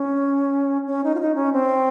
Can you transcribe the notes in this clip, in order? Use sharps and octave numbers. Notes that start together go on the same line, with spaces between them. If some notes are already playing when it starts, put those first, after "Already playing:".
Already playing: C#4
C#4
D#4
F4
D#4
C#4
C4